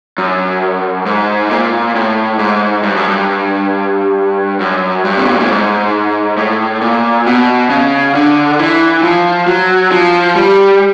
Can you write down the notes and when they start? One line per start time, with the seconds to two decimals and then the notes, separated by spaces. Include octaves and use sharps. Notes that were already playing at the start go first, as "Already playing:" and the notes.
0.18 F#2
1.06 G#2
1.51 A#2
1.95 A2
2.39 G#2
2.83 G2
2.96 F#2
3.08 G2
4.60 F#2
5.05 G2
5.17 C3
5.26 B2
5.33 A#2
5.41 A2
5.49 G#2
6.37 A2
6.81 A#2
7.27 B2
7.70 C#3
8.14 D3
8.59 E3
9.03 F3
9.47 F#3
9.91 F3
10.36 G3